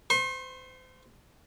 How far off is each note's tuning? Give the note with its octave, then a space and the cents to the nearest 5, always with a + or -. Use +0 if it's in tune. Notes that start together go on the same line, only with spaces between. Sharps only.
C5 -35 C6 +40